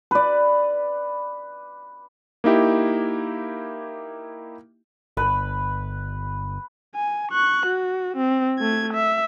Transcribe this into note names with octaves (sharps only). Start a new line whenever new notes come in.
B4 D5
A#3 D#4 E4 G4
G1 B4
G#5
C#6 F#6
F#4
C4
A3 G#6
E5